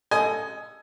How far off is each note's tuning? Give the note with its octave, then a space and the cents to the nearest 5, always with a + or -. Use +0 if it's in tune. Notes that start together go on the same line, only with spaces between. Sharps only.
A4 +10 D#5 +0 G#5 +20